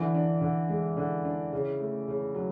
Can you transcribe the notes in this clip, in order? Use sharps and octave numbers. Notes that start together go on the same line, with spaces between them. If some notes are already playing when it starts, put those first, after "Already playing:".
Already playing: D3 E3
D4
D3
G#3
D3
D4
C#3
A3
C#3
F#3